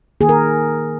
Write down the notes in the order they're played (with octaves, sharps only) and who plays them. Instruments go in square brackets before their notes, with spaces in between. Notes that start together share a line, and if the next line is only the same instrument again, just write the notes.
[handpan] D#3 A#3 G#4
A#4